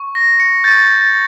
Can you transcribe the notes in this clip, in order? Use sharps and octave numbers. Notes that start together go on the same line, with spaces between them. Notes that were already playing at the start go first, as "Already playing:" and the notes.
Already playing: C#6
A#6
C#7
C#6 G6 A6
G6
A6